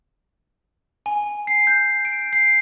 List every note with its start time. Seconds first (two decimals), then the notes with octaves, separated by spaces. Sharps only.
1.06 G#5
1.47 C7
1.67 G6
2.05 D7
2.33 C7